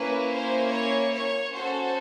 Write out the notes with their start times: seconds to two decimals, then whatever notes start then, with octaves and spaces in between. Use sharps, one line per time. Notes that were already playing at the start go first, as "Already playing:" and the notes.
Already playing: A#3 C#4 E4 B4
0.30 C5
0.71 C#5
1.12 C#5
1.53 C#4 F#4 A4 C5